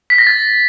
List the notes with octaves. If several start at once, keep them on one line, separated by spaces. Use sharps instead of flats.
B6
A#6
A6